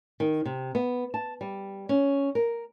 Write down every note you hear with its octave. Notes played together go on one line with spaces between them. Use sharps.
D#3
C3
B3
A5
G3
C#4
A#4